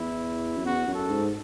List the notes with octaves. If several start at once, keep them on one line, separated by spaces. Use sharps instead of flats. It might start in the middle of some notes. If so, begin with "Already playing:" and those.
Already playing: E2 E4
F#2
E2 F#4
F#2
A4
G#2